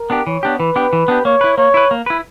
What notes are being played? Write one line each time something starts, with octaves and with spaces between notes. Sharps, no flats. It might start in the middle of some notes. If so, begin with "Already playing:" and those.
Already playing: A#4
B3 D4 G4
E3 C#5
B3 D4 G4
E3 B4
B3 D4 G4
E3
B3 D4 G4
A#3 C#5
E4 B4
A#3 C#5
E4 B4
A#3
E4 B4